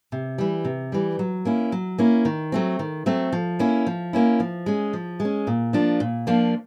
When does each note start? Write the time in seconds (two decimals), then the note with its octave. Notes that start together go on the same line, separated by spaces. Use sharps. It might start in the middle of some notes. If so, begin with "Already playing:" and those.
0.12 C3
0.38 E3 G3
0.65 C3
0.92 E3 G3
1.19 F#3
1.45 A#3 C#4 E4
1.72 F#3
1.98 A#3 C#4 E4
2.25 D#3
2.52 F#3 A3 C4
2.79 D#3
3.06 F#3 A3 C4
3.33 F3
3.59 A#3 C#4 E4
3.87 F3
4.13 A#3 C#4 E4
4.40 F3
4.66 G#3 C#4
4.93 F3
5.20 G#3
5.25 C#4
5.47 A#2
5.73 F3 A#3 D4 F4
6.00 A#2
6.27 F3 A#3 D4 F4